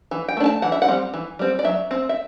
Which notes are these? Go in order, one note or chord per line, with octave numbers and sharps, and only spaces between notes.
E3
G5
A3 D4
A5
E3 F#5
E5
F#5
G3 C4
E3
G3 C4
D5
F#3 E5
C4
E5